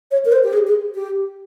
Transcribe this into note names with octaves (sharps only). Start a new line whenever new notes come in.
C#5
A#4
C5
G4
G#4
G#4
G4